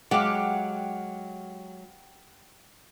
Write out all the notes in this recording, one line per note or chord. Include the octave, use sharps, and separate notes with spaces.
F#3 G#3 G4 F5 F#5